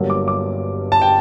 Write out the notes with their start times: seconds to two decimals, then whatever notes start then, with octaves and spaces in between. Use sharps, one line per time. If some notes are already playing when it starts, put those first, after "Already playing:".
Already playing: G1 G2 F#3 A#3
0.10 D6
0.28 D6
0.92 A5
1.02 G5